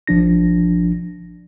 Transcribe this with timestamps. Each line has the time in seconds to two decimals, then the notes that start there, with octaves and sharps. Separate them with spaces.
0.07 A1 F3 D4 A#6